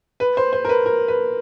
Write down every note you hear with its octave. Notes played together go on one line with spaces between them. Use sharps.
B4
C5
C5
A#4
B4
A#4
B4